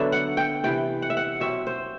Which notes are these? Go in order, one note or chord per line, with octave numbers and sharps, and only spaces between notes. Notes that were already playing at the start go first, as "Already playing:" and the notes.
Already playing: D3 F#3 B3 D4 E5
F#5
G5
C3 E3 B3 G5
F#5
E5
F#5
B2 F#3 C4 E5
C5